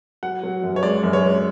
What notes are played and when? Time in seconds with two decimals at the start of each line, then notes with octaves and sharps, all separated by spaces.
0.23 F#3 F#5
0.43 F#3
0.64 F#2
0.76 C#5
0.83 G#3 D5
1.04 F#2
1.13 C#5
1.24 G#3